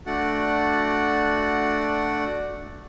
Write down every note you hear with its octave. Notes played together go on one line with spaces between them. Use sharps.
A3 D4 F#4 D5 F#5